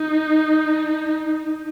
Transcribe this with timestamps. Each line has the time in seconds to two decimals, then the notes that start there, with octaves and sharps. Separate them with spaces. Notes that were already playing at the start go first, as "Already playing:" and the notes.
Already playing: D#4